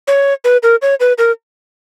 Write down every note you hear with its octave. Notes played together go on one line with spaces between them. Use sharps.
C#5
B4
A#4
C#5
B4
A#4